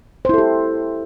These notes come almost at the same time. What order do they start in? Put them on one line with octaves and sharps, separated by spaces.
C5 E4 A4 G4